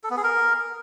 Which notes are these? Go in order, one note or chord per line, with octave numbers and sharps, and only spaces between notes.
A4
B3
G#4
A#4